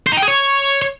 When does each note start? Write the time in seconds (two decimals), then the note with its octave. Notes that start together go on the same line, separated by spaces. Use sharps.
0.07 C5
0.12 D#4
0.17 G5
0.23 G#4
0.28 C#5